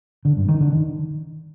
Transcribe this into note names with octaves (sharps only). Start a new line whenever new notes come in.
D3
G2
D#3
D3
D#3